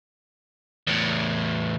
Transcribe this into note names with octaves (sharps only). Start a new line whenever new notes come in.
E2 A2